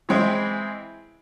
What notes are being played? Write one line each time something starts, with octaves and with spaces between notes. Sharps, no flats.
E3 G#3 C4 E4